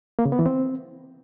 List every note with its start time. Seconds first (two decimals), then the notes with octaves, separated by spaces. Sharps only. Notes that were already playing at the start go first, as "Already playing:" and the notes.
0.19 A#3
0.25 C#3
0.32 B3
0.39 E3
0.46 C4